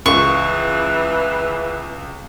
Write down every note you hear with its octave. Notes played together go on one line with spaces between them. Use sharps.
C#2 E3 C#6